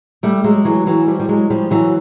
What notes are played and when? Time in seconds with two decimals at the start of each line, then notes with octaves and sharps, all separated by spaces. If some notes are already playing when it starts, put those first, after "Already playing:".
0.23 G3 A3
0.44 F#3 G#3
0.65 E3 F#3
0.86 E3 F#3
1.08 F3 G3
1.20 G3
1.29 F#3 G#3
1.50 F3 G3
1.71 E3 F#3